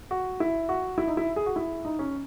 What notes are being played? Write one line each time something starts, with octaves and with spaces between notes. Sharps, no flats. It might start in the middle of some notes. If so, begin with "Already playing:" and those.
F#4
E4
F#4
E4
D#4
E4
G#4
F#4
E4
D#4
C#4